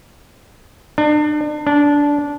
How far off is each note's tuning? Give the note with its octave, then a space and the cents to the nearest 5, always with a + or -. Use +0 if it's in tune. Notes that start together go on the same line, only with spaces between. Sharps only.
D4 +35
D4 -15